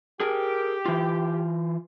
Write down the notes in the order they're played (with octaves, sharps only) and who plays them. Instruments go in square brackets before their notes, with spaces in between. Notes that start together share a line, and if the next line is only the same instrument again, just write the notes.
[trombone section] G4 [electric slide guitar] G#4 A#4
[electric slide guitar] E3 F4